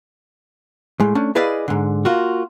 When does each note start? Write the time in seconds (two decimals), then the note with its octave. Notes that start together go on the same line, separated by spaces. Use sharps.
1.00 A2 G#3
1.15 A3 C#4 D4
1.35 E4 G#4 B4 D5 D#5 F5
1.68 G#2 D3
2.05 A#3 F4 F#4